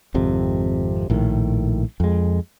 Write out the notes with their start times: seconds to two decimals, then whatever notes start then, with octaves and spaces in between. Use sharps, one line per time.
0.14 G#1 F2 C3
1.10 A#1 A2 D#3
2.00 F2 G#3